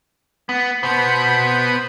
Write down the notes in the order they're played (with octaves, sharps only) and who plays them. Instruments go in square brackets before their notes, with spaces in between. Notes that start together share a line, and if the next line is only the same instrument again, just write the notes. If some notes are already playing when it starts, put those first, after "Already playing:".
[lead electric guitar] B3
[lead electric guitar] B2 B3 [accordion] C5 B5